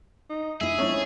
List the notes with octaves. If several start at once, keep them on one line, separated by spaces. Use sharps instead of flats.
D#4
A3 E4 G#4 E5
G#3 A3 C4 C#4 E4